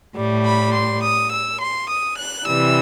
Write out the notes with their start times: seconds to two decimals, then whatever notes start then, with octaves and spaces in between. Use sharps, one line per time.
0.16 A2 G3
0.45 B5
0.74 C6
1.03 D#6
1.32 E6
1.61 C6
1.89 D#6
2.19 F#6
2.47 C3 E3 G3 E6